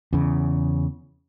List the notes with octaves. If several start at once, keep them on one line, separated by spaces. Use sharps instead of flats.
E2 C#3